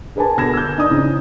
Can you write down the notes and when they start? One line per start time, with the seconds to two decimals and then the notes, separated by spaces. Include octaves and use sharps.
0.16 G#4 A#4 B4 G#5 A5
0.37 B2 D3 G#6 A#6 E7
0.54 E6 G6
0.78 D#4 D5 D#6
0.91 C#3 E3 C4 D#4